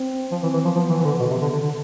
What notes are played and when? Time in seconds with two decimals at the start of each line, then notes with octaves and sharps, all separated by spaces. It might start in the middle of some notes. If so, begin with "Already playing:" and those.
Already playing: C4
0.32 F3
0.43 E3
0.53 E3
0.65 F3
0.75 F3 B3
0.90 E3
1.01 E3
1.04 D3
1.20 B2
1.31 C3
1.42 D3
1.53 D3
1.63 D3